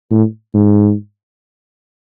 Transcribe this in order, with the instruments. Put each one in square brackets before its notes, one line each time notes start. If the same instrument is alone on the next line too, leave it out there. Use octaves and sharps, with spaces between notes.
[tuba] A2
G#2